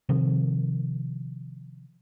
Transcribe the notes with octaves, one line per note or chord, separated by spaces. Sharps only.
C3 D#3 F3